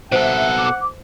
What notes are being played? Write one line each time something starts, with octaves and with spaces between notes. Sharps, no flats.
B2 A4 C5 E5 F#5
D6